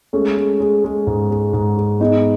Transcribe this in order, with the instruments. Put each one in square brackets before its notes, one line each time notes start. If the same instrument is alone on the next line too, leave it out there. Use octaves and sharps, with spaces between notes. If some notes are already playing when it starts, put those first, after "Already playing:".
[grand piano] G#3 [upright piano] A3 C#4
[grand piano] G#3
G#3
G#3
G#2
G#3
G#2
G#3
[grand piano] G#3 [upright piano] B3 D#4